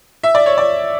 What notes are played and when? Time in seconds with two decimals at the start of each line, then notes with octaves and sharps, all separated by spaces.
0.23 E5
0.35 D5
0.46 C#5
0.58 D5